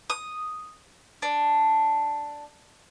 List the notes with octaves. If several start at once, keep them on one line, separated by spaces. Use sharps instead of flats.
D#6
D4